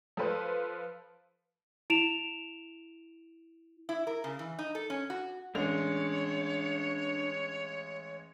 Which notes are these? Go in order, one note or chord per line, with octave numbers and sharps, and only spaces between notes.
F3 A4 B4 C5
E4 D7 E7 F7
E4
A#4
C#3
E3
D#4
A4
C#4
F#4
A1 G#3 D4 C#5 F7